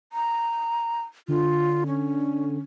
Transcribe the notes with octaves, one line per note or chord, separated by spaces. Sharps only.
A#5
D3 F4
C#4